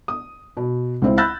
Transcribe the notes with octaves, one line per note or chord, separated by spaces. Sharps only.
D#6
B2
C#2 C4 E4
B5 E6 F#6 G6 A6 A#6